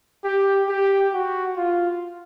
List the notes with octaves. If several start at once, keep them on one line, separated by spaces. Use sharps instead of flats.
G4
G4
F#4
F4